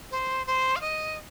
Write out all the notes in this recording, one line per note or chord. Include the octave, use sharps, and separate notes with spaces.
C5
C5
F5
D#5